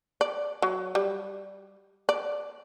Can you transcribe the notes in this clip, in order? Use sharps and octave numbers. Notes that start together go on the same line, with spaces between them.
D5
F#3
G3
D5